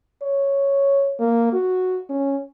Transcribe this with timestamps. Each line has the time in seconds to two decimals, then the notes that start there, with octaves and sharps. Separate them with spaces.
0.23 C#5
1.20 A#3
1.53 F#4
2.09 C#4